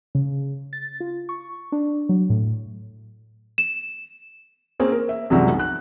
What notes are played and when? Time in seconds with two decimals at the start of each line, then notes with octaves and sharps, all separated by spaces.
0.15 C#3
0.73 A6
1.00 F4
1.29 C#6
1.72 D4
2.09 F#3
2.30 A2
3.58 E7
4.80 A#3 C4 C#4 G#4
4.92 A#4
5.09 E5
5.30 C2 F#2 C3 F3 F#3 G#3
5.48 B1
5.59 F#6